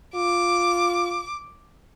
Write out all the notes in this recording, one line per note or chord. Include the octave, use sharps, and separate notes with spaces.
F4 D6